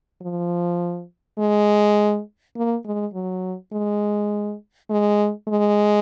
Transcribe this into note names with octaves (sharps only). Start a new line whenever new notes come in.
F3
G#3
A#3
G#3
F#3
G#3
G#3
G#3